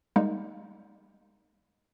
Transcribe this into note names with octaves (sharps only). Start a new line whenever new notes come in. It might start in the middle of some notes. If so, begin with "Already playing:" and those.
G3 G#3 A#3 D#4